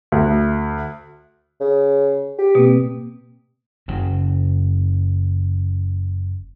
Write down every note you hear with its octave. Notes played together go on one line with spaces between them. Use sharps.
D2
C#3
G4
B2 A#3 C4
F#1 C#3 F#3